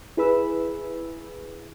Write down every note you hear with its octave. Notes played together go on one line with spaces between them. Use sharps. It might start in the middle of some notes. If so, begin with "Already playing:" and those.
E4 G#4 B4 B5 E6